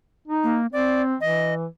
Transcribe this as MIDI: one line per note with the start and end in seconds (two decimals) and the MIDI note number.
0.28 0.57 63
0.44 0.67 58
0.73 1.15 60
0.73 1.02 74
1.21 1.66 52
1.21 1.54 75